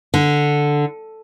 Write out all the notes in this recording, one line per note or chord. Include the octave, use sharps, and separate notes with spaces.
D3